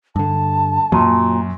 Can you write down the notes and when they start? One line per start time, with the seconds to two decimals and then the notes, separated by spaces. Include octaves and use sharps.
0.16 G2 D3 A5
0.92 F#2 A#2 F#3